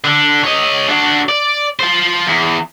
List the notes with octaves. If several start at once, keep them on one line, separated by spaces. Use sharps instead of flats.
D3 D4
C#5 D#5
D4 F#4
D5
F4 C5
E2